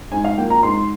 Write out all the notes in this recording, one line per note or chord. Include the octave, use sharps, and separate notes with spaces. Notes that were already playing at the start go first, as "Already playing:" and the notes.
G#2 G#5
F5
F3 A#3 G5
A#5
G#2 C6